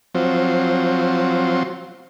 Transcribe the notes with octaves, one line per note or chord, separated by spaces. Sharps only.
F3 F#3 C4